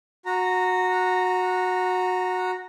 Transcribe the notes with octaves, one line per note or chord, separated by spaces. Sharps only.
F#4 A#5